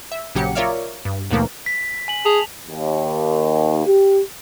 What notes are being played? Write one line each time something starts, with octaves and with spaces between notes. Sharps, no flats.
E5
A#1 C#3 F#3 G4 C#7
F4 A#4 C#5 D5 E5 F5
G2
D#2 B2 F3 A3 A#3
B6
G#5 F#7
G#4 A5 F7
D#2
G4